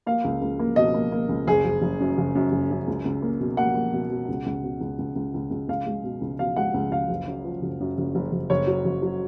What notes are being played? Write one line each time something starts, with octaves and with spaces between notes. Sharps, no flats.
A#3 F5
C#2
C#2
A#3
B2 D#5
A#3
A#3
C#2
F#1 G#4
F#1
F#1
F#2
F#1
F#2
F#1
F#2
C#2
C#2
A#3
B2
A#3 F#5
A#3
B2
B2
C#2
C#2
B2
C#2
C#2
C#2
C#2
C#2
C#2 F5
G#3
B2
C#2
B2 F5
G#3 F#5
C#2
C#2 F5
F#1
F#2
F3
F#1
F#2
F#1
F#1
F#1
F#1 C#5
F#3
F#1
F#3